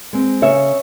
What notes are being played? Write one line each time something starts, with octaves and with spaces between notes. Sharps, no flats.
G#3 C4
C#3 C#5 E5